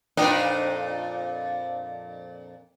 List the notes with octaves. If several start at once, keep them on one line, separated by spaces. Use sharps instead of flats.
F2 A#2 D4 D#4 B4 G5